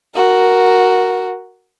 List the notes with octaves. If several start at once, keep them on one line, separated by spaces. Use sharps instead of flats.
F#4 A#4